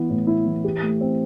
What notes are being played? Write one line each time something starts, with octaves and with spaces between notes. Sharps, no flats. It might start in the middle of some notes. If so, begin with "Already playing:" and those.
Already playing: E3 B3 E4
A2
E4
E3
G4
A3
C4